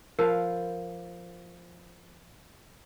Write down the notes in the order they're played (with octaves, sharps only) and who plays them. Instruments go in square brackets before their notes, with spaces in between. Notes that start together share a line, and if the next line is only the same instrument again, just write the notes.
[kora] F3 B4 F5 [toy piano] A#4